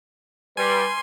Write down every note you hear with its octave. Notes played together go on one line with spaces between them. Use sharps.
G3 B4 G#5 C6